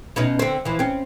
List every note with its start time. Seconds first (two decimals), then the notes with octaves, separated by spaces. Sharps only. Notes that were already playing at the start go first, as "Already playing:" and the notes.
0.16 B2 C#4 D#4
0.39 D3 C4
0.65 E3 F3
0.79 C4 C#4